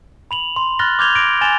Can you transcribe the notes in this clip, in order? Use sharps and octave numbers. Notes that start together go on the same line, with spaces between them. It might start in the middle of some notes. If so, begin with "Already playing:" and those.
B5 F7 F#7
C6
B5 F6 F#6 A6 A#6 G7
D6 F6 G6 G#6 F7 G7
D6 A#6 D7 G7
G#5 A6 E7 F7 G7